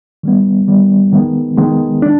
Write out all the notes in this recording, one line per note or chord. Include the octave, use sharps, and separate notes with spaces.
D#3 G3 B3
D#3 G3 B3
D#3 G#3 B3
D#3 G#3 B3
D4